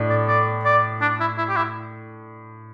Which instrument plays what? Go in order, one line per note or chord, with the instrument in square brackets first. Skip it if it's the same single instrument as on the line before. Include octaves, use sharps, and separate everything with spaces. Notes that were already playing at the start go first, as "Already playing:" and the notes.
Already playing: [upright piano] A2 D4
[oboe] D5
D5
D5
D4
E4
E4
G4
E4